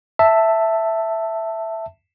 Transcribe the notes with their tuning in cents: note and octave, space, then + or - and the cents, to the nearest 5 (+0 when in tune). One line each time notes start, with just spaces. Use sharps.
E5 +0 A5 +10